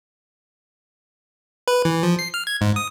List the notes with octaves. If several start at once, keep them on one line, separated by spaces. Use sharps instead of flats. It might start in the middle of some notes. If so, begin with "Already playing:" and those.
B4
E3
F3
C7
F6
G#6
G#2
D#6